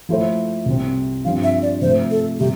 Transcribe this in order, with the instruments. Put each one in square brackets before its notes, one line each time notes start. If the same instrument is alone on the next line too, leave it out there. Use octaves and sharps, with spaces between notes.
[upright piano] F3 A3 E4 A4 C5
C2 C3 G3 C4
[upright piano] G2 F3 C4 G4 [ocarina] F5
[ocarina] E5
D5
[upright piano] C3 F3 A3 [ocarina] C5
[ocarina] A4
[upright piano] C3 G3 [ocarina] G4